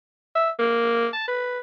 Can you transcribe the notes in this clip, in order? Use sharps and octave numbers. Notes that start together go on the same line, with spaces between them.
E5
A#3
A5
B4